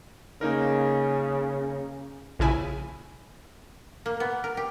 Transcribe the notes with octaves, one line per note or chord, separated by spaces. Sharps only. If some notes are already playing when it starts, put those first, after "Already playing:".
C#3 A#3 D#4 A#4
A#1 C#3 E4 G#5
A#3
B3
A#4
G4